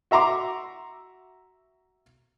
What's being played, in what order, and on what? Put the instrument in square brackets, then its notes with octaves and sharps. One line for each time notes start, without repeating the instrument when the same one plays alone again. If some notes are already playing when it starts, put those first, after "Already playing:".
[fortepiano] F#4 E5 A#5 C6 D6